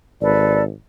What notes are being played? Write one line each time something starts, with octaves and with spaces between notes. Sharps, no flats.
G#1 A4 B4 D5